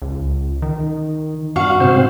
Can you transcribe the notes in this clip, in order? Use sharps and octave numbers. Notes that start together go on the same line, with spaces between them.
C#2
D#3
G2 F#4 F5
G#2 C3 C4 C5